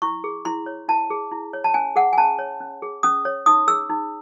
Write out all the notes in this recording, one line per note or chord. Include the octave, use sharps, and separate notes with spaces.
E4 C#6
G#4
E4 C6
C#5
E4 A5
G#4
E4
C#5
A5
C#4 G#5
G#4 F#5
G#5
C#4 A5
C#5
C#4
G#4
C#4 D#6
C#5
D#4 D#6
G#4 E6
D#4